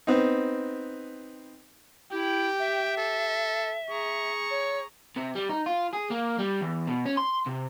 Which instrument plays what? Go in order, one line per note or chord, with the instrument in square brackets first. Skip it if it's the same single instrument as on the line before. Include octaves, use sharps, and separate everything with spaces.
[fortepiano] B3 C4 D#4
[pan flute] E4 [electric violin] G4 [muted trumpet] G5
[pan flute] E5
[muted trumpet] A4
[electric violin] G#4 A#5 [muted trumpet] C#6
[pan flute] C#5
[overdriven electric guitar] C3
G3
D#4
F4
G#4
A#3
G3
E2
B2
C#4
C6
C3